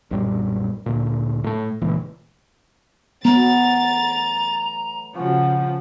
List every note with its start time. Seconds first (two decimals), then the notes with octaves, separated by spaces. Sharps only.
0.11 B1 F#2 A#2 G3
0.86 D2 A#2
1.44 A2 A3
1.82 D1 C#2 A#2 E3
3.25 A2 E3 F#3 B3 A#5 A6
5.15 C#3 F3 F4 F#4 G#5